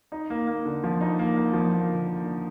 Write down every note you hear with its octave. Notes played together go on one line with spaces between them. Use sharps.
D#4
A#3
A#3
D3
F3
D#4
A#3
A#3
F3
A#3
D3
A#3
D3